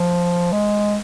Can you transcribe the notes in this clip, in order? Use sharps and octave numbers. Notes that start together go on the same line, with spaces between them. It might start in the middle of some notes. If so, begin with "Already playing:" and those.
Already playing: F3
G#3